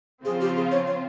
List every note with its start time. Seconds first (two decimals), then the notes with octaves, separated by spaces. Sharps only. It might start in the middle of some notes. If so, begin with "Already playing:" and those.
0.24 C#3 F3 C4 F4 G#4 C5
0.41 G4
0.56 G#4
0.71 C#5
0.87 C#5